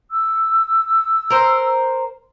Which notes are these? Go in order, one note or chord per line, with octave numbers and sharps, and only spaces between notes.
E6
A#4 C5